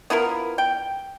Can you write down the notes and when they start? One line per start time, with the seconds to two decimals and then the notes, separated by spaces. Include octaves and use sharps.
0.10 B3 E4 F4 A#4
0.58 G5